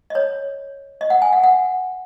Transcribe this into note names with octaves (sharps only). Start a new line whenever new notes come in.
D#5
C#5
D#5
F#5
G#5
F#5
F#5